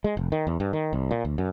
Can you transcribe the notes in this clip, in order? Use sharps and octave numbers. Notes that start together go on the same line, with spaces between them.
G#3
F1
D#3
E2
G2
D#3
C2
A#2
D2
F#2